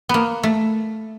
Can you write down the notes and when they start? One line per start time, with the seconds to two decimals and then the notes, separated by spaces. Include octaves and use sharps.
0.09 A#3 B3
0.43 A3